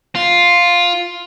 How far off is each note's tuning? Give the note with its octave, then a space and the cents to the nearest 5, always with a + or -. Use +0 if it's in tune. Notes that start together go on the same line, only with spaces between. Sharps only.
F4 +5